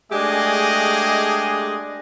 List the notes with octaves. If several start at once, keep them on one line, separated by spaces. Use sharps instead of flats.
G#3 A3 D4 G4 G#4 D#5